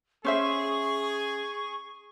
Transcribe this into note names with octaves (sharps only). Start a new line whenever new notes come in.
C#4 G#4 C5 E5 C#6